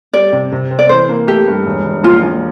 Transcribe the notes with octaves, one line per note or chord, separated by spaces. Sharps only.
G3 D5
C3
C3
C4
D5
E3 C5
A#3
A3 G4
G2
E1
E1
A#1 F4
A#1